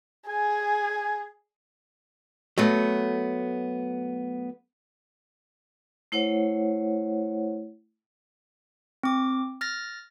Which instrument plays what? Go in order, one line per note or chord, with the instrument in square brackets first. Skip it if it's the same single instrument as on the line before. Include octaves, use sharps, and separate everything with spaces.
[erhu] G#4 [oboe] G#5
[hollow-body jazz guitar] F#3 A3 B3
[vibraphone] A3 E4 C5 C#5 F#5
[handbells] C4 D6
F6 A6 A#6